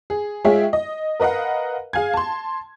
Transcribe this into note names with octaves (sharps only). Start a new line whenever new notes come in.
G#4
G#3 F4 G#4 C#5 E5 G5
D#5
A#4 B4 D#5 F5 F#5
G#4 F5 G#5 G#6
A5 C6